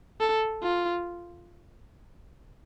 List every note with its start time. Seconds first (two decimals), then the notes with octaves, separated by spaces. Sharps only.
0.20 A4
0.63 F4